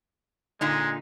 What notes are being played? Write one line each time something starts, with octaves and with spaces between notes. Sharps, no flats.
A#2 D3 G#3 D#4